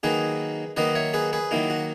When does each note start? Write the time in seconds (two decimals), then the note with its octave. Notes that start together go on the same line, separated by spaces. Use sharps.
0.03 D#3 F#3 A#3 D#4 G#4 B4
0.77 D#3 F#3 A#3 D#4 B4 D#5
0.95 C#5 E5
1.14 G#4 B4
1.33 G#4 B4
1.51 D#3 F#3 A#3 D#4 E4
1.70 F#4